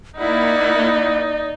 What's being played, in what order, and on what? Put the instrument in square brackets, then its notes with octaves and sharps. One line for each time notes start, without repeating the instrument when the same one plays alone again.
[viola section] A#3 E4 F#5 [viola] D#4 [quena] D5